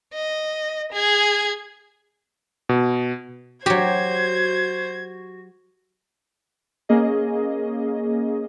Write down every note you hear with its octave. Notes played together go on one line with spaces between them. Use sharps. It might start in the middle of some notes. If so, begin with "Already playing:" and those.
D#5
G#4 G#6
B2
F#3 F#4 G4 C5 G#6
A#3 C#4 G#4 D#5